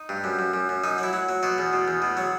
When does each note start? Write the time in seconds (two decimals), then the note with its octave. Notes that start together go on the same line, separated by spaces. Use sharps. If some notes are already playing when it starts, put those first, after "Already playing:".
Already playing: D#4
0.09 G2
0.24 F#2
0.39 F#2
0.54 F#2
0.69 F#2
0.84 F#2 D#4
0.98 F#3 E4
1.13 F#3
1.29 F#3
1.43 B2 F#4
1.58 E2
1.73 B2
1.88 E2
2.02 B2
2.17 F#3